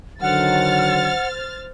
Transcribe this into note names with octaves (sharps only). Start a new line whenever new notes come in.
D3 D#3 F#3 C5 F#5 F6 A6